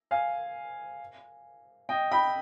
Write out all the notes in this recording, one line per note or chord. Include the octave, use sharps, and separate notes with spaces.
F5 G#5
D#5 G5
G5 B5